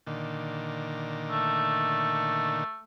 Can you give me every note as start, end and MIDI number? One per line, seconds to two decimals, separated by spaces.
0.07 2.64 46
0.07 2.64 50
0.07 2.64 51
1.31 2.83 57